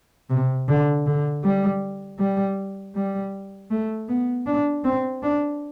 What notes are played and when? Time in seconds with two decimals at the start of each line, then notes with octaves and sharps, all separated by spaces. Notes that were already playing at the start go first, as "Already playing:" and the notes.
0.30 C3
0.68 D3
1.06 D3
1.44 G3
2.19 G3
2.95 G3
3.71 A3
4.09 B3
4.46 D4
4.84 C4
5.23 D4